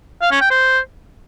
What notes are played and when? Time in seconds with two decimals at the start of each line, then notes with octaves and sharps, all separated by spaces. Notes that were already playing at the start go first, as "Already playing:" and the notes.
0.22 F5
0.31 C#4
0.41 G5
0.51 C5